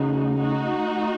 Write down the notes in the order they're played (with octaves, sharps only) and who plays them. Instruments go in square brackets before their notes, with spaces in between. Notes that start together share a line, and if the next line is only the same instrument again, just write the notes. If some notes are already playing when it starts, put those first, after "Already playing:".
Already playing: [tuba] C#3 [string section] A3 D#4 F#4
[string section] A3 D#4 F#4